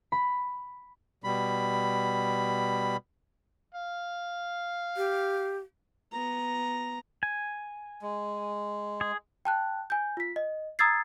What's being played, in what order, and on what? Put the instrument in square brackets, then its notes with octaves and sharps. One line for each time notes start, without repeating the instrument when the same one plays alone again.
[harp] B5
[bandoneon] B2 G3 B5
[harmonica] F5
[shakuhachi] G4
[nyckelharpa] B3 A#5
[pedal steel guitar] G#5
[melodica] G#3
[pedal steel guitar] G#4
[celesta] G5 A5 F#6
G#5 G6
F4 B6
D#5
A#5 D#6 E6 G#6 A6 C7